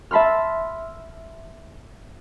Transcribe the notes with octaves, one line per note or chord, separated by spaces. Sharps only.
E5 A5 B5 C6 F6